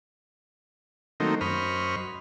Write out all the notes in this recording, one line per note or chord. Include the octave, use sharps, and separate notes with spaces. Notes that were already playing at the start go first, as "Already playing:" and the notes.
D#3 F#3 A3 A#3 C4 D#4
F#2 C5 D#5 B5 C#6 F6